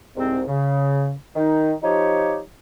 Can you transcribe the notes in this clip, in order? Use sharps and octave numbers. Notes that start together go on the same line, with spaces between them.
C2 G#2 C4
C#3
D#3 D#4
F3 D#4 G4 C#5